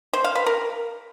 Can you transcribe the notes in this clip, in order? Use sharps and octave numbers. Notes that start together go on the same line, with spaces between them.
C5
F5
B4
A#4